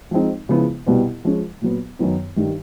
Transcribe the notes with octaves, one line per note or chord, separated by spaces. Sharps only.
F3 G#3 C4 D#4
C#3 F3 G#3 B3 E4
C2 B2 G3 B3
F3 G#3 C#4
A#2 F#3 B3
F#2 D#3 F#3 B3
G2 D#3 G3